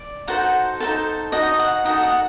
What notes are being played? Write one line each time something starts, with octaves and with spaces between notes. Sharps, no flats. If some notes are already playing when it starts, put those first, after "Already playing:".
Already playing: D5
D#4 F#4 A4 C5 F#5
D#4 F#4 A4 C5
D#4 F#4 A4 D#5
F#5
D#4 F#4 A4 D#5
F#5